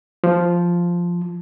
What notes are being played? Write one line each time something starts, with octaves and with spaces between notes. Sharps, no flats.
F3